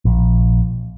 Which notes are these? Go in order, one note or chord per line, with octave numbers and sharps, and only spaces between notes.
A#1